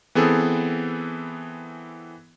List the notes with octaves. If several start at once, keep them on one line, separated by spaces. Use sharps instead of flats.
E3 B3 C4 G#4 A4